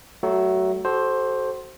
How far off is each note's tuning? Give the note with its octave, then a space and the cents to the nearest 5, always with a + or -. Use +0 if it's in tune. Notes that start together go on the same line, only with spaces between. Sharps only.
F#3 +25 A3 +0
F#4 +35 A4 -15 C5 +10